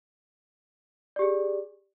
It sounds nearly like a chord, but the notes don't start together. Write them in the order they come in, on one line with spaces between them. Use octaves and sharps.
D5 G4 G#4